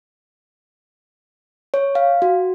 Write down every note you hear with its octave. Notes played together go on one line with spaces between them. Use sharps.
C#5
F5
F#4